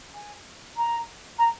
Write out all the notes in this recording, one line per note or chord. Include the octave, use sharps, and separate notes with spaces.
G#5
A#5
A#5